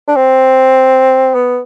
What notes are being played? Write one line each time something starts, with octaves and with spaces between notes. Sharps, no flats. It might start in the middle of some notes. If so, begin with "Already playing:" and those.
D4
C4
B3